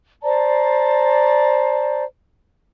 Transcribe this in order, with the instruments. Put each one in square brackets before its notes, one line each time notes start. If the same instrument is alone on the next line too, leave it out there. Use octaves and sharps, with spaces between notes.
[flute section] C5 D5 A5 A#5